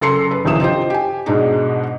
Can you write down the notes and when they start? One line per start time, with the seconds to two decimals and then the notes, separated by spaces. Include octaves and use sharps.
0.01 F#1 A4 A#5 C6 C7 C#7
0.31 B4
0.45 D#1 A#1 C3 E3 D#6 E7
0.60 D#4 F4 G4 C5
0.90 G4 G#5
1.26 G#2 B2 G#3 D4 D#4